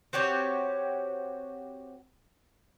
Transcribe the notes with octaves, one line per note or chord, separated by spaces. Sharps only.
C4 F#4 G4 C#5